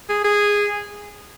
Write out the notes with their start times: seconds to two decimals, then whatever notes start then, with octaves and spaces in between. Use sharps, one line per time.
0.09 G#4
0.24 G#4